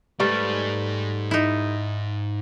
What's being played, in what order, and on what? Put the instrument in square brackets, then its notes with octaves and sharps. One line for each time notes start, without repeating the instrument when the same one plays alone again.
[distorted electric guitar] G#2 [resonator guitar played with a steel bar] G3 A3 B4
[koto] D#4 E4